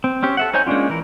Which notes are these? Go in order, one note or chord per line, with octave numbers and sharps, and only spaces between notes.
C4
C4 C#4 G4
A4 E5 F#5
D#4 C5 C#5 G#5 G6
G#3 A#3 C#4 D4 F4
E3 A#4